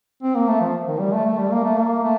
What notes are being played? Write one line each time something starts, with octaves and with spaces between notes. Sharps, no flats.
C4
A#3
A3
F3
D#3
G3
A3
A3
G3
A#3
A3
A#3
A3